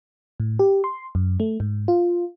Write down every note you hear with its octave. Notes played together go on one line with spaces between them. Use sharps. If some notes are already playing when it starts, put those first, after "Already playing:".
A2
G4
C6
F#2
A3
G#2
F4